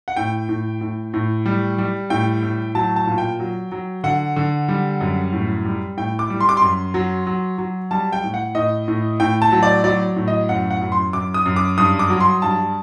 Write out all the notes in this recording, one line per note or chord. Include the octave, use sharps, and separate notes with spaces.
F#5
A2 G5
A2
A2
A2
G3
G3
A2 G5
A2
F#3 A5
A5
A#2
G5
F#3
F#3
D3 F#5
D3
G3
F#2
A2
G3
A2 G5
D6
G3
C6
D6
F#2 C6
F#3
F#3
F#3
G3 A5
G5
A2
F#5
A2 D#5
A2
A2 G5
A5
F#3
D5
F#3 D5
A2
D#5
F#2 F#5
F#5
F#2
C6
F#2 D6
D#6
F#2
D6
G2 D#6
D6
F#3
C6
G2 A5